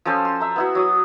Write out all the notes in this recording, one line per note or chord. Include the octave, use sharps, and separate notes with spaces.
F3 C#4 A4 C5
C6
E5 A#5
B3 E4 F#4
F#3 D#6